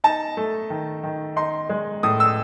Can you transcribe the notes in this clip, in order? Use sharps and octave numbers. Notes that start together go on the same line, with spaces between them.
D#4 A5
A3
D#3
D#3
D#4 C6
G#3
A2 D#6
E6